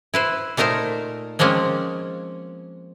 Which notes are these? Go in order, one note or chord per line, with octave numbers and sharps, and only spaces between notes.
E4 B4 C5
A#2 A3 D#4 A#4 C5
F3 G#3 A#3 C4 C#4